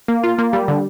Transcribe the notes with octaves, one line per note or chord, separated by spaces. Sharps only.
A#3
F4
A#3
G3
D3